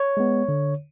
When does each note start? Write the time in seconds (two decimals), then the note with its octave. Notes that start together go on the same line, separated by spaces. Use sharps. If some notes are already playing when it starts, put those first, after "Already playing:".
Already playing: C#5
0.17 G#3 B3
0.48 D3